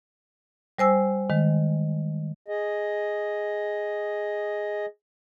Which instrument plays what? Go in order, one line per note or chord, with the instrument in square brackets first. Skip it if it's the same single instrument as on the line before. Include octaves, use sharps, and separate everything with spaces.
[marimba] G3 C5 G#5 E6
D#3 G#3
[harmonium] G#4 D#5